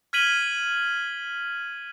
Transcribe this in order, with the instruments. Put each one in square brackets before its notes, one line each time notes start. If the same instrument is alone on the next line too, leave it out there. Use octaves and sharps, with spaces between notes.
[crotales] F6 G#6 B6 D#7 F#7 G7